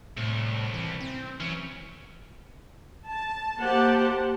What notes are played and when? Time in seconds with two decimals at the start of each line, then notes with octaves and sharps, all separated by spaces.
0.17 C2 A2
0.74 E3
1.01 C4
1.40 E3 F#3 C#4
3.08 A5
3.60 A#3 G4 C5 F#5 A5